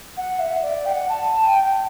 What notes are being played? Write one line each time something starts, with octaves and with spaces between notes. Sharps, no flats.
F#5
E5
D5
G5
F#5
A5
G5